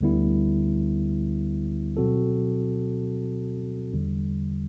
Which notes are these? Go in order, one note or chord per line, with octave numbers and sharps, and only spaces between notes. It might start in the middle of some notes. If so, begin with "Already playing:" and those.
D2 D3 G3 B3 E4
B2 F#3 C4 F#4 A4
E2 D3 G3